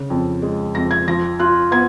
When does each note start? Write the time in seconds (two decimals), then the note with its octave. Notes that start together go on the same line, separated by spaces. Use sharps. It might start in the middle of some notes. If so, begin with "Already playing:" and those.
Already playing: C#3
0.10 F2
0.42 G#3
0.75 F2 A#6
0.91 G#6
1.08 F3 A#6
1.40 F4 F#6
1.71 B3 G#6